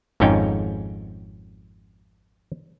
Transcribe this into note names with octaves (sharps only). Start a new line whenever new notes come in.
G#1 F2 G#2 C#4 D#4 G5